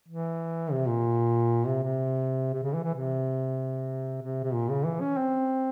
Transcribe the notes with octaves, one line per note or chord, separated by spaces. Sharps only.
E3
C3
A#2
C3
C3
C3
C#3
E3
E3
C3
C3
C3
A#2
C#3
E3
C#4
C4